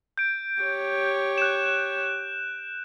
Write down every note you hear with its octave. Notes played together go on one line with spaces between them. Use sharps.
G6 D7
G4 C#5
F#6 E7